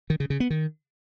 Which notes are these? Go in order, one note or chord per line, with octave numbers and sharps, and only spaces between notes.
D#3
C#3
C#3
B3
D#3